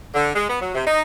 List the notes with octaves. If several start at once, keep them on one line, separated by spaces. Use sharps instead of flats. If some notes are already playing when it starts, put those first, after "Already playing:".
D3
G#3
B3
F#3
C3
D#4